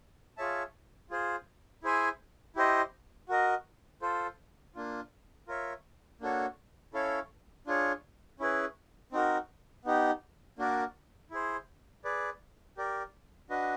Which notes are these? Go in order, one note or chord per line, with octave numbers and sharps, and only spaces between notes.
F4 G#4 C#5 E5 A5
F4 G#4 C5
E4 G#4 C5 E5 G#5
E4 G4 C5 D#5
F#4 A#4 D#5
F4 A4 C5
A#3 D4 F4
F4 A#4 C#5 E5
A#3 D4 F#4 A4 C#5
C#4 E4 A4 C#5 F5
D4 F4 G#4 C#5
C#4 E4 G#4 B4
C4 D#4 F#4 A#4
B3 D#4 G4
A#3 D4 F#4 A#4 D5
E4 G#4 C5
G#4 B4 D5
G4 A#4 D5
D4 F#4 B4 D#5